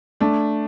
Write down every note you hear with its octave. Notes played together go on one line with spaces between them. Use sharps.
A3 D4